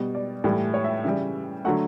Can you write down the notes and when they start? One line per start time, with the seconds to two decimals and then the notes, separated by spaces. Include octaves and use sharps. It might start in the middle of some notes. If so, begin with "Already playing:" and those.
Already playing: B2 G3
0.15 D5
0.44 A2 E3 G3
0.74 C#5
0.84 E5
1.04 C#3 E3 G3 E5
1.65 D3 F#3 A3 F#5